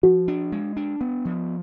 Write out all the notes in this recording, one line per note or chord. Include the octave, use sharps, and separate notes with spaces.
F3 F#4
D4
G#3
D4
B3
F3